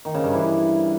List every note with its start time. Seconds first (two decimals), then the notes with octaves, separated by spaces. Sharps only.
0.05 D#3
0.15 C#3
0.24 G2
0.33 E3